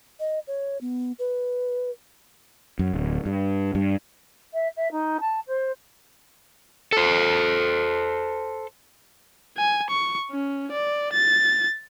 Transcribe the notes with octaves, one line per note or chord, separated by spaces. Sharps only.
D#5
C#5
B3
B4
F#2
D1
G2
G2
E5
E5
D#4
A5
C5
A4 C5
G#5
C#6
C#4
D5
A6